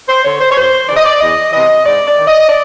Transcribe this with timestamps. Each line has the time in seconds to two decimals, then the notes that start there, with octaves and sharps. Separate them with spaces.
0.08 C5
0.24 D3 C#5
0.40 C5
0.51 C#5
0.57 F#2 C5
0.88 C#3 E3 D5
0.97 D#5
1.05 D5
1.21 E2 D#5
1.53 C3 E3 D#5
1.85 G#2 D5
2.07 D5
2.17 D#3
2.28 D#5
2.49 D5